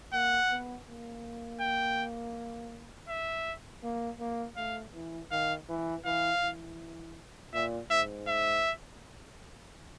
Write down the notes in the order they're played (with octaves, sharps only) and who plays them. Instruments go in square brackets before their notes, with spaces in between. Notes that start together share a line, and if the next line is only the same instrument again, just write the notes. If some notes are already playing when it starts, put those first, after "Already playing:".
[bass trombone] A#3 [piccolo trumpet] F#5
[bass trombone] B3
A#3
[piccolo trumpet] G5
E5
[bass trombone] A#3
A#3
[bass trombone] A3 [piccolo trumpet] F5
[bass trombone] E3
[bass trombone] D#3 [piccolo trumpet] F5
[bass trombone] E3
[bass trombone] E3 [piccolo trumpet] F5
[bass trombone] E3
[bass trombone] A#2 [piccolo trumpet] E5
[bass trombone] G#2 [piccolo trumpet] E5
[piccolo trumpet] E5